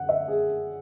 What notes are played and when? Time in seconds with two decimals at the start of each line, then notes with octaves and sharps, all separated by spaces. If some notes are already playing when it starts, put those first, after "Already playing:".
Already playing: F#2 D3 F#5
0.09 E5
0.28 G#4